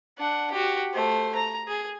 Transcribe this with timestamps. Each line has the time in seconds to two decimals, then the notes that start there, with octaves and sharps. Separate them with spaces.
0.18 D4 F#5
0.52 F#4 G4
0.93 A3 C5
1.35 A#5
1.68 G#4